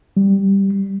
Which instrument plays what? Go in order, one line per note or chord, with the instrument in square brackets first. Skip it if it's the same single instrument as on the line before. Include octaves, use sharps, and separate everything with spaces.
[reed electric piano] G3